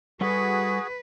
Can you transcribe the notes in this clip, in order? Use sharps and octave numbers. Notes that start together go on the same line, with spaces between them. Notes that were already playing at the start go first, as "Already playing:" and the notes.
G3 F#4 G#4 A4 B4 F#5